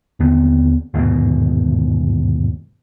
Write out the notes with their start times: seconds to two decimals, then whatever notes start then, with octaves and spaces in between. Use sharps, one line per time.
0.20 D#2 D3 B3 C4
0.94 G1 D#2 G#2 B2